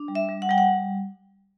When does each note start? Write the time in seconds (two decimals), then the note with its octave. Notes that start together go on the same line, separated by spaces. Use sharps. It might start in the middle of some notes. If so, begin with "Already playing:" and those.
Already playing: D4
0.08 G3
0.15 E5
0.29 G3
0.42 F#5
0.49 G3 G5
0.58 F#5